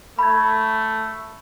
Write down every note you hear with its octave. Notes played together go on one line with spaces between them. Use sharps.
A3 B5 G#6